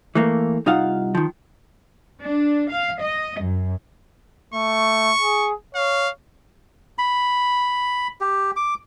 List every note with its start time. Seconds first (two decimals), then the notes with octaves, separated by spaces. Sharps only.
0.15 E3 A3 A#3
0.66 C2 D#4 F4 F5 F#5
1.15 D#3 F3
2.22 D4
2.71 F5
3.02 D#5
3.41 F#2
4.54 A3 C#6
5.20 G#4
5.75 C#5 F5
6.98 B5
8.21 G4
8.56 D6